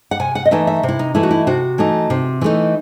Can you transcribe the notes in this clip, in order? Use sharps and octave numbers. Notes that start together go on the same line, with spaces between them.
F#5
C3 G#5
F#5
D#5
E3 A3 D#4 E5
E5
C3
E4
D#4
E3 A3 D#4 E4
F#4
E4
C3 F#4
E3 A3 D#4
C3
E3 A3 D#4